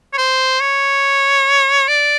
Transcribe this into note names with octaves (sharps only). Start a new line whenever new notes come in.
C#5
C5
C#5
D5